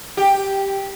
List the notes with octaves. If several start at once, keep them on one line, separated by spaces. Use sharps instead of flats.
G4